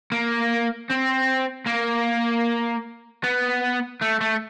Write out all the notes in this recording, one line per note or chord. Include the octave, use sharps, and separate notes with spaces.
A#3
C4
A#3
B3
A3
A3